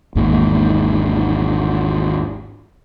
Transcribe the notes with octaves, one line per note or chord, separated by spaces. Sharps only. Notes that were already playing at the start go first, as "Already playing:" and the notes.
G#1 E2 G#2 A#3